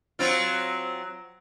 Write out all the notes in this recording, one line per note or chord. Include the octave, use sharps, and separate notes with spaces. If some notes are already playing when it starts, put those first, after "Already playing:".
F#3 C4 F4